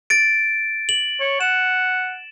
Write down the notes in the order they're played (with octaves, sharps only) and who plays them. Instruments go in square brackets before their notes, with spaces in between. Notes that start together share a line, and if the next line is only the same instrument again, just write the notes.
[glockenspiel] A6 D7
F#7
[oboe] C#5
[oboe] F#5 [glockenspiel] E7